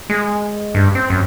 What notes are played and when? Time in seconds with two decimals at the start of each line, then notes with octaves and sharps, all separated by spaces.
0.10 G#3
0.75 G2
0.95 C4
1.10 F#2